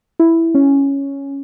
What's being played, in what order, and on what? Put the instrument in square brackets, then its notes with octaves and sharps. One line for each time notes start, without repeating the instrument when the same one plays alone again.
[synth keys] E4
C#4